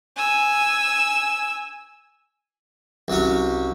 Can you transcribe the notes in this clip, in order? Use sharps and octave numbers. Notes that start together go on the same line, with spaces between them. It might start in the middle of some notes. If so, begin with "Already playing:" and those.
G#5 E6
C2 F#3 C#4